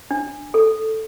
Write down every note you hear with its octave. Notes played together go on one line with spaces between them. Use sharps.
D4
A4